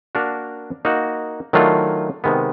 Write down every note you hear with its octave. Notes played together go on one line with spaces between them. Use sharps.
A#3 D4 F#4 A#4
A#3 D#4 F#4
D#3 F#3 A3 D4 F4
C3 D#3 G#3 B3